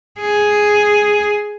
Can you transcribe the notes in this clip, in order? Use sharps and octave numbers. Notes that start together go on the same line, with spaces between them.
G#4